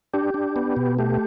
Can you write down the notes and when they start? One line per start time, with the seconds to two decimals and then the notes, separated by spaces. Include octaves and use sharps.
0.14 D4 G4
0.34 D4
0.56 B3
0.77 B2
0.98 A3 G4